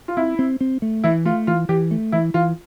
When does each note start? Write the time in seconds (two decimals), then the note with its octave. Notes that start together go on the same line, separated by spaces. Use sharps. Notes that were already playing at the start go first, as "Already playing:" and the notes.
0.08 F4
0.17 C4 E4
0.39 C4
0.61 C4
0.82 A3
1.04 E3 E4
1.25 A3 F4
1.47 E3 F4
1.69 E3 G4
1.91 A3
2.12 E3 E4
2.34 E3 F4